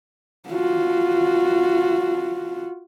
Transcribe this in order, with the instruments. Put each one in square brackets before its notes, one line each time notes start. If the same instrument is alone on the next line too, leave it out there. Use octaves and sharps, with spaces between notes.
[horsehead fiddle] F4 F#4